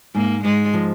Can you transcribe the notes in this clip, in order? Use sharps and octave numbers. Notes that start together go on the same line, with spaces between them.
G#2 A#3
G#2 G#3
F3